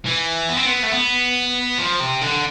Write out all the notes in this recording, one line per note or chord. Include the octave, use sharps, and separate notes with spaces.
E3
B3
C4
B3
A3
B3
F3
C3
D3